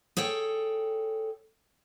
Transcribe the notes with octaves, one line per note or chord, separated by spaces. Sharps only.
G#4 A4 C#5 G5